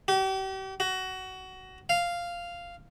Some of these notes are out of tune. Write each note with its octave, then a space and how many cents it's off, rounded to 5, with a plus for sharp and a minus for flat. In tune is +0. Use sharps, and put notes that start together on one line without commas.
G4 -40
F#4 +20
F5 -5